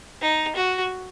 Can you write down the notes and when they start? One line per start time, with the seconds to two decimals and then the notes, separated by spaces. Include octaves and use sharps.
0.22 D#4
0.56 F#4